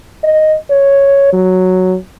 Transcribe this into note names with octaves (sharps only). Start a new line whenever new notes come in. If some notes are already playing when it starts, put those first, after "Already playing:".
D#5
C#5
F#3